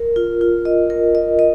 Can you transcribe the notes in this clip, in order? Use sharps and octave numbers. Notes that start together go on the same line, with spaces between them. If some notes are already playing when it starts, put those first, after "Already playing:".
Already playing: A#4
F4
F4
D#5
A#4
D#5
D#5